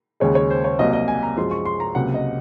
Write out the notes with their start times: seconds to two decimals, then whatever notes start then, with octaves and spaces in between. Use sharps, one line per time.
0.20 D#2 C#3 G#3 C#5
0.35 C#5
0.50 C5
0.64 C#5
0.79 C2 C3 F#3 A#3 D#5
0.93 D#5
1.08 G#5
1.23 A#5
1.37 F#2 F3 G#3 C6
1.51 C#6
1.65 C6
1.80 A#5
1.95 C#2 C3 F#3 A#3 F#5
2.14 D#5